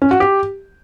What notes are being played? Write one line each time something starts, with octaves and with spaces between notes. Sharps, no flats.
C#4
F#4
G4